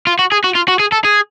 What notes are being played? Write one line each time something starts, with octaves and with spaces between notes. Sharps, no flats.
F4
F#4
G#4
F#4
F4
F#4
G#4
A4
G#4